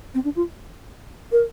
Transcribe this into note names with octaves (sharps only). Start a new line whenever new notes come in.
C4
D4
F4
A#4